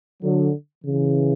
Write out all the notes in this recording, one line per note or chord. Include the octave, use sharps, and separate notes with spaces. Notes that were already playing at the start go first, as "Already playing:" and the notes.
D3 F#3
C#3 E3